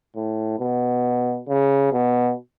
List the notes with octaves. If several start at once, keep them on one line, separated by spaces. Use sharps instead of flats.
A2
B2
C#3
B2